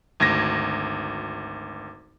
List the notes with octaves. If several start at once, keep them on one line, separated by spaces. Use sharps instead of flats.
G#1 D2 G#6 A#6